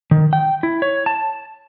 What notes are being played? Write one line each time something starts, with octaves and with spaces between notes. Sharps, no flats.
D#3
G5
E4
C#5
A5